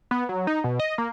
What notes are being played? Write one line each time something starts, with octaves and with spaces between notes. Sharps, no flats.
B3
F#3
D#4
B2
D#5
A#3